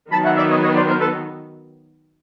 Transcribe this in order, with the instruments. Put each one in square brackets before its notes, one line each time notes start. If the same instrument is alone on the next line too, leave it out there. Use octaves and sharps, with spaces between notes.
[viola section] D#3 F#3 B3 [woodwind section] A5 B5
[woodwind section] E5 F#5
D5 E5
C#5 D#5
C#5 D#5
C5 D5
A#4 C5
A4 B4